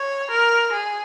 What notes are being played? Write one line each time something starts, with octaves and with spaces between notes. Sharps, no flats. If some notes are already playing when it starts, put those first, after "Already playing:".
Already playing: C#5
A#4
G#4